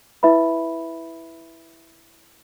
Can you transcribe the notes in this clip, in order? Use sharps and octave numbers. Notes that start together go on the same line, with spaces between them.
E4 B4 E5 B5